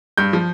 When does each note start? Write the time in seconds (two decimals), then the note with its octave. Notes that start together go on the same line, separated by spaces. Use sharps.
0.17 G2 G6
0.33 F3